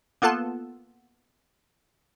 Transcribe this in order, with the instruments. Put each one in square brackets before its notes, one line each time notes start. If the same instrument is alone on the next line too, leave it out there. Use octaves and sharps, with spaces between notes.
[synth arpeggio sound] A#3 B3 F4 A4 A5